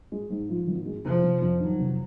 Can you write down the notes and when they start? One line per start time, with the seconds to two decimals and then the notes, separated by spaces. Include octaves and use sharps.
0.12 G#3
0.30 G#2
0.49 F3
0.67 G#1
0.86 G#3
1.04 F1 F3
1.23 F1
1.42 F2
1.60 D#3 F#3
1.79 F1